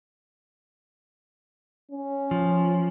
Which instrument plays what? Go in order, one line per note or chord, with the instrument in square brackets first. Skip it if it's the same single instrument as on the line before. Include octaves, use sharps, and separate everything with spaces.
[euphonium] C#4
[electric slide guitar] F3